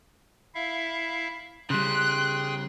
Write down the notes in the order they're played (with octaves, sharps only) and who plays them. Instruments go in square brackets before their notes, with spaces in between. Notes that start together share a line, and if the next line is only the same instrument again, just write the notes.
[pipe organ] E4 E5 F5
[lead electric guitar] C#3 G3 [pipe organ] G#4 G5 C6 [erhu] F#6